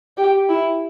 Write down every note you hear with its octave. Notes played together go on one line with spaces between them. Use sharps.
G4
E4